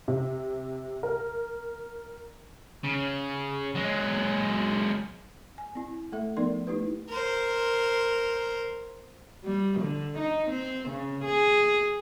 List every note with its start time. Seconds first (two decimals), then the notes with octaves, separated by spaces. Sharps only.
0.08 C3
1.03 A#4
2.84 C#3
3.75 F#3 G#3
5.58 G#5
5.75 C4 E4
6.12 A3 A4 E5
6.37 F3 B3 D#4 A#4 D5 C6
6.67 A3 D#4 E4 G4 B4
7.09 A#4 C5
9.45 G3
9.81 D3
10.18 D#4
10.51 C4
10.89 C#3
11.25 G#4